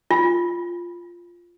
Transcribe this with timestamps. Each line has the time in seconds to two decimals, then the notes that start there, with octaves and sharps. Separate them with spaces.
0.11 F4